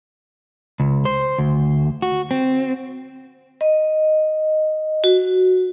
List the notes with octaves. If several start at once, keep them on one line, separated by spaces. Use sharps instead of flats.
C#2
C5
D2
F#4
C4
D#5
F#4